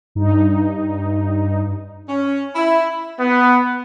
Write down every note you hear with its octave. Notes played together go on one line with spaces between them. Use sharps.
G2 D#4
C#4
E4
B3